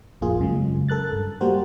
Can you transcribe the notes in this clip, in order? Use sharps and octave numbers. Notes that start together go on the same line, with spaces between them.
A1 F2 A#3 F4 G#4
F#2 C#3 F#3 G#3
A4 A#4 F#6 A6
G2
G3 A#3 F#4 G4 A#4 C5